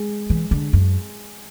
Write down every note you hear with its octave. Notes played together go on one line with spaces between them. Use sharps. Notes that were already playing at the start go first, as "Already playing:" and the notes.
Already playing: G#3
E3
D3
F#2